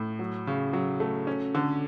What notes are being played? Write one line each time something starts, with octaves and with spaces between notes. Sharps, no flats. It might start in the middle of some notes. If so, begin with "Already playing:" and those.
Already playing: A2
F#3
C#3
F#3
A3
C#4
D3